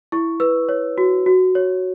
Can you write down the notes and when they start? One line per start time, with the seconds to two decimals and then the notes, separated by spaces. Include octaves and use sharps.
0.12 E4 C#6
0.40 B4 E6
0.69 C#5
0.98 F#4
1.26 F#4
1.55 C#5